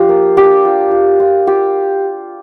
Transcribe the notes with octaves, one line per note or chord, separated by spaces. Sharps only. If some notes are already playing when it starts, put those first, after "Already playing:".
Already playing: F3 D4 F4 G4
A#3
D4 G4
F4
F4
F4
F4 G4